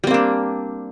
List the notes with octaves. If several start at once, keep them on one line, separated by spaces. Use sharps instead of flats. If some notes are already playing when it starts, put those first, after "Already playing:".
G3 A#3 C4 D4